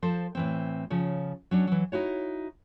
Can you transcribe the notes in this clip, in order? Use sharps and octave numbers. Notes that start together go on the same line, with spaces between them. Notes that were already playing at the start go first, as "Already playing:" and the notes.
F3 A4 C5
A2 E3 C4
C#3 F3 C#5
F#3 C#4 D4
E3 F#3
D#4 E4 F#4 C#5